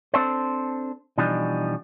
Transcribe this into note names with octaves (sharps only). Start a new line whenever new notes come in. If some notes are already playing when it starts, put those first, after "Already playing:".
C4 D4 A4 C5
B2 E3 F3 G3 D4 D#4